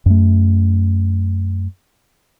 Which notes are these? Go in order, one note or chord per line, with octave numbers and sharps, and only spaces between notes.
F#2 A3